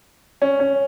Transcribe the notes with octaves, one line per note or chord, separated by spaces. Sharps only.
C#4
C#4